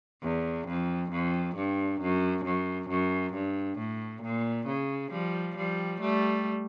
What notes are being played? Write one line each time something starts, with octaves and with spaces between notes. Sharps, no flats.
E2
F2
F2
G2
F#2
F#2
F#2
G2
A2
A#2
C#3
F3 G3
F3 G3
G3 A3